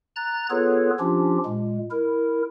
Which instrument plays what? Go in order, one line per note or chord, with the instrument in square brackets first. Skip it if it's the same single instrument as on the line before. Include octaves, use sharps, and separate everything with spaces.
[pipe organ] A#5 F#6 A6
B3 F4 G#4 A4 B4 C#5
F3 C#4 D4 F4 G4
A#2 G#3
E4 A#4